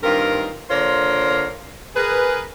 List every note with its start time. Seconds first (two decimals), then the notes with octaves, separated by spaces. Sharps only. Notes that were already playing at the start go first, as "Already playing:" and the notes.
0.02 G2 D#3 C4 F4 A#4
0.69 D3 A#3 F4 A#4 C5 C#5
1.95 G#4 A#4 B4